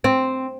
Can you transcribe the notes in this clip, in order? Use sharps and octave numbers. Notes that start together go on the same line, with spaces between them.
C4